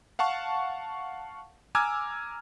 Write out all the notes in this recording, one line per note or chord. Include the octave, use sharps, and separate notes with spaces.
F5 F#5 A5 C#6
G#5 A#5 D6 E6 F6 G#6